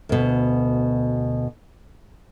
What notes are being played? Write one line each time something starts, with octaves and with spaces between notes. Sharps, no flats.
D2 B2